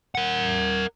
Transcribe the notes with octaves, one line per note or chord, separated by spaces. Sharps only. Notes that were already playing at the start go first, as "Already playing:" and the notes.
A#4 F#5